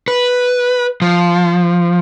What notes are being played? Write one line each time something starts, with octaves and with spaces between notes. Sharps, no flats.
B4
F3